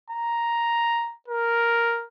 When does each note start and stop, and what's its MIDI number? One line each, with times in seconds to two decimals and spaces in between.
0.10 1.13 82
1.28 2.05 70